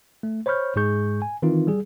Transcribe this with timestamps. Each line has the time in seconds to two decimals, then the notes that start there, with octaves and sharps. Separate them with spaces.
0.23 A3
0.46 C5 C#5 B5 C#6 F6 G6
0.76 G#2 G#3 G#4 C#6 G6
1.22 G#5
1.42 D#3 E3 C4 D#4 F4
1.67 G3 G#4